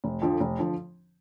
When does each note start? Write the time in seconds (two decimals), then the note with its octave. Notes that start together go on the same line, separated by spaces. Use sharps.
0.04 F1
0.22 F2 D3 F3
0.40 F1
0.59 D3 F3